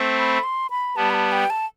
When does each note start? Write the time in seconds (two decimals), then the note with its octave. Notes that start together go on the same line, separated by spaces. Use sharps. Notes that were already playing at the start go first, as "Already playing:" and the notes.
Already playing: A3 C4
0.18 B5
0.43 C6
0.70 B5
0.96 G3 B3 A5
1.10 B5
1.14 A5
1.32 G5
1.50 A5